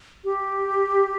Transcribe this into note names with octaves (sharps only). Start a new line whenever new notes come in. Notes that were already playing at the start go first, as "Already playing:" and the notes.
G4